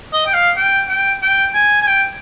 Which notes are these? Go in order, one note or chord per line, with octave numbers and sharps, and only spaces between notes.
D#5
G5
F5
G5
G5
G5
G#5
G#5
G5